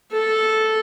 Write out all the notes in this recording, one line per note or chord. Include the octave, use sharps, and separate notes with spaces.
A4